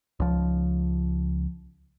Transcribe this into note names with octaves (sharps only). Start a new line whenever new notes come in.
C#2 F3